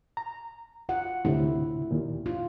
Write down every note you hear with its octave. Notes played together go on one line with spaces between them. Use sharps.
A#5
F4 F#5
D2 A2 C3 E4
D#2 A#2
F4